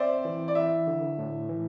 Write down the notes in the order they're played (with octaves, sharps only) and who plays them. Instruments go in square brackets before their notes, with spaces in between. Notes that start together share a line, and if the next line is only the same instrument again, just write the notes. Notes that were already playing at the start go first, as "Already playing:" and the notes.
Already playing: [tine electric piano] C4 [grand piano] C5 D5 E5
[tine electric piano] E3
[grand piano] D5
[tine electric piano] E4 [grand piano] E5
[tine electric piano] D3
A2
E3